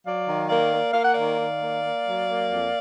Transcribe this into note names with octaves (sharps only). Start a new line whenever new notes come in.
F#3 D5 F5
D#3
A#3 D5 F5
A#3
A#3 F5
F#5
D#3 D5 F5
D#3
A#3
A#3
F#3
A#3
F2